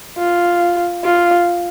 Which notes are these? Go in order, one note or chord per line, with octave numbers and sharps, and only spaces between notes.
F4
F4